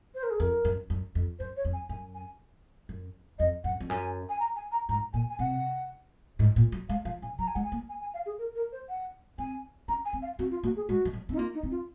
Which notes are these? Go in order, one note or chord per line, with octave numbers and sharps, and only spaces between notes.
C5
A#4
G#4
F2 A#4
F#2
F#2
F2
F#2 C5
C#5
F2
G#5
F#2 G#5
G#5
F#2
F2 D#5
F#2 F#5
F2
F#2 G#5
G#5
A#5
G#5
A#5
G#2 A#5
A#2 G#5
G#5
C3 F#5
G#2
A#2
F#3
G#3 F5
F3 F5
C#3 G#5
F#3 A#5
G#5
G#3 F#5
G#5
A#3
G#5
G#5
F5
G#4
A#4
A#4
C5
F#5
C4 G#5
C#4 A#5
G#5
C4
F5
C4 F#4
F4
A#3 F#4
G#4
G#3 F#4
F3
F#3
C4 D#4
A#3 F4
D#4
C4
F4